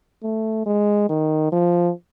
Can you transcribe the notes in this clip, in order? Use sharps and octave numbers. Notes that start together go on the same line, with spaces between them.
A3
G#3
D#3
F3